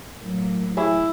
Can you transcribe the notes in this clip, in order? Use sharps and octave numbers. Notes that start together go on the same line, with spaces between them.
A2 F#3 A#3
E3 E4 G#4 C#5